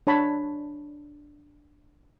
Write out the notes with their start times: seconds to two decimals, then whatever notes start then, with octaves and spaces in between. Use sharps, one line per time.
0.07 D4 C#5 A5 B5